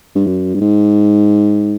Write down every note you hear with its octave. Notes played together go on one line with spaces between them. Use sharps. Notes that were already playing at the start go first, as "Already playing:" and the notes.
G2
F#2
G2
G#2